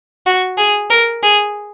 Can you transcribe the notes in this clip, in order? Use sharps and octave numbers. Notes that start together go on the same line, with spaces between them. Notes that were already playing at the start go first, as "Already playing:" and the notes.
F#4
G#4
A#4
G#4